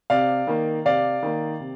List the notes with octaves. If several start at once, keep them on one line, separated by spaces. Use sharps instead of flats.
C3 D5 F5
D#3 A#3
C3 D5 F5
D#3 A#3
C3